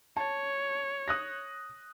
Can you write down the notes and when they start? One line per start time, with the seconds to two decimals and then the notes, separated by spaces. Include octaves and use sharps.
0.17 C#5 A5
1.08 D#6 F#6 A#6